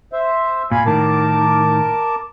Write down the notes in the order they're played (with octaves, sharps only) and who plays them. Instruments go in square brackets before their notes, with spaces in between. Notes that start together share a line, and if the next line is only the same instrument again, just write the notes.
[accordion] C5 E5
[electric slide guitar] A#2 [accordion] F5 G#5 B5
[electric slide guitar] A2 D#3 [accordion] A#4 A5 D6